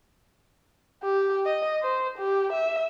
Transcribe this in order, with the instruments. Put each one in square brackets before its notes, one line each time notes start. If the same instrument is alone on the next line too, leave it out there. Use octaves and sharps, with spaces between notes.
[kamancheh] G4
D#5
C5
G4
E5